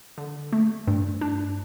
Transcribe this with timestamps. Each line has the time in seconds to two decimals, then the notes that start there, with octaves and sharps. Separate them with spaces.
0.18 D3
0.53 A3
0.87 G2
1.21 D4